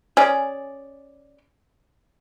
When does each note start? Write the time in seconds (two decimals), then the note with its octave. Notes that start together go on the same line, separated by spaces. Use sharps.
0.17 C#4 G#4 D5